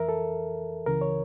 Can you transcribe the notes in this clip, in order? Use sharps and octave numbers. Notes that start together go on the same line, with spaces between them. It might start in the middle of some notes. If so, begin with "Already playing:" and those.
Already playing: F2 E3 A#4 E5
A4
C#2 C#3 E3 A#4
C#5